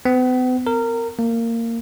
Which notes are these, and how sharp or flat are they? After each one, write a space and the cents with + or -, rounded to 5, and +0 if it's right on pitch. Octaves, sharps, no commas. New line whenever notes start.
B3 +45
A#4 -20
A#3 -20